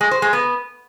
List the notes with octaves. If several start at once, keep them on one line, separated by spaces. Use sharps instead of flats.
G#3
C5
G#3
B3